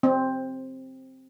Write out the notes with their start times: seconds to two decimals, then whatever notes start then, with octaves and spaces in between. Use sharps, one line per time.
0.03 C4